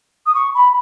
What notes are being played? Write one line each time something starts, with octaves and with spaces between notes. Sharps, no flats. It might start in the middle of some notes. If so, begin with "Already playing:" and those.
D#6
C#6
B5